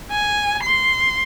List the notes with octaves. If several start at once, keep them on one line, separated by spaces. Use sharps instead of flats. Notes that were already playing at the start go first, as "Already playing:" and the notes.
G#5
C6